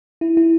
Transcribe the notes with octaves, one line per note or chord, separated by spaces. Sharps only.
E4
E4